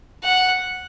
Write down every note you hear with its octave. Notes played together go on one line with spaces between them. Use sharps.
F#5